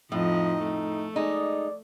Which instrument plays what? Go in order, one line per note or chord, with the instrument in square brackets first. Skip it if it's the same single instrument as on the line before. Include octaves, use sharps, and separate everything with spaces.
[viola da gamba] F2 F3 D#5 [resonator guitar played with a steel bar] A2 [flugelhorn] D#4
[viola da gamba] A3
[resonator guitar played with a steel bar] G#3 D#4 [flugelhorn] D5